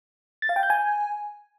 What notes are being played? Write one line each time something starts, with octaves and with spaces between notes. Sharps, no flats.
A6
F5
G5
G6
G#5